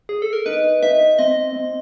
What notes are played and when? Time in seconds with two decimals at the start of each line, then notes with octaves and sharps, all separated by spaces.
0.09 G#4
0.22 A4
0.33 A#4
0.45 D#4 B4
0.82 D#4 E5
1.18 C4 D#5
1.55 C4